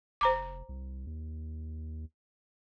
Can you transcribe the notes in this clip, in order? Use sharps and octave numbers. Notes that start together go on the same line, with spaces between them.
F1 C5 A#5 D6
C2
D#2